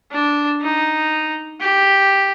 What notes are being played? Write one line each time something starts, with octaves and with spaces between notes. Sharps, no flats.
D4
D#4
G4